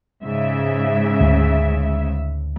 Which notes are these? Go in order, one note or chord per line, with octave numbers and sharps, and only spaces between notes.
G#2 C#3 E5
D2